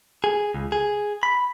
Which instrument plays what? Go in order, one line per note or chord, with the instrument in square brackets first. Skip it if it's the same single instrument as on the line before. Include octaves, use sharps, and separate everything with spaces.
[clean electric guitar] G#4
C#2
G#4
B5